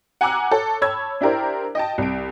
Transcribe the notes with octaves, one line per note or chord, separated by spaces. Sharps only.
F#5 G#5 A#5 D6 E6 F#6
A4 C#5
C#5 A5 B5 E6 G#6
D4 E4 G4 A#4 C5 D5
D#5 G5 A5
C2 D7